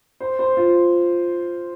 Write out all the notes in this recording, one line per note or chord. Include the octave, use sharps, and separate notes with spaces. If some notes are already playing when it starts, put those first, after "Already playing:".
C5
C5
F4